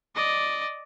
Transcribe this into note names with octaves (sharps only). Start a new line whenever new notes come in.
D5 D#5